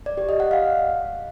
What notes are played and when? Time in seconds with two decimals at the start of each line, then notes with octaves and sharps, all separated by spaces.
0.06 D5
0.17 G4
0.29 D#5
0.40 F#5
0.51 F5